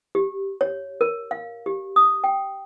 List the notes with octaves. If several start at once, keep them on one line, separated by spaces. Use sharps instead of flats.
G4
C#5
A#4
F5
G4
D#6
G5